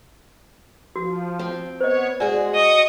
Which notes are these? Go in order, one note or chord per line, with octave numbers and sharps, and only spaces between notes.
F3 F#4
C4
B3 C5 C#5 D#5
G#3 F#4 G#4 D5 G#5
D#5 C#6 D#6